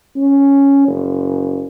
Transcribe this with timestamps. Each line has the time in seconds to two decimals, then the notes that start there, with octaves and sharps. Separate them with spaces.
0.15 C#4
0.87 F#1